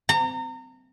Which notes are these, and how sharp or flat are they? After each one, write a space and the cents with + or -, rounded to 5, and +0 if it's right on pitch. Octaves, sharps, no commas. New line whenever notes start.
A#5 -30